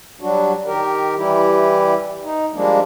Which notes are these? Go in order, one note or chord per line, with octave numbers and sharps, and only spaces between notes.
F#3 G3 D4 F#4
D#3 G4 A#4
E3 G3 E4 G4
D#4
F3 G3 G#3 A#3 D4